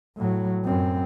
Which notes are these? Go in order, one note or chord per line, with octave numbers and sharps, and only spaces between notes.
A2 F#3
F#2 C4